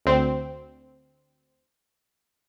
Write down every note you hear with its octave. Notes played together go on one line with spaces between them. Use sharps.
D2 C4